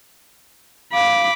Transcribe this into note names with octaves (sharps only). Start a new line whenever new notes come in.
F5 B5 D6